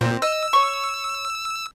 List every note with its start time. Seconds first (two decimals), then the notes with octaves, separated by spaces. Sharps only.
0.01 A#2 C4
0.22 D#5 E6
0.53 C#5 C#6